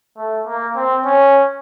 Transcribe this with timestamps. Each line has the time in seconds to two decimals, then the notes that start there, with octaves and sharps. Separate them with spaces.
0.17 A3
0.47 A#3
0.76 C4
1.05 C#4